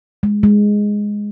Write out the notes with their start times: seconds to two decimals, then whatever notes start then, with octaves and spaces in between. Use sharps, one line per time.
0.23 G#3
0.43 G#3